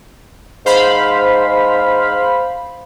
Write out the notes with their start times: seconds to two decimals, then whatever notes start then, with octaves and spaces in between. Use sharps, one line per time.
0.66 G#2 C5 F5 B5